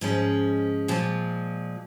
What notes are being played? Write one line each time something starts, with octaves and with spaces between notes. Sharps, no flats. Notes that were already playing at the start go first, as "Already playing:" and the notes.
G#2 F3 G#3 C#4
A#2 F3 G#3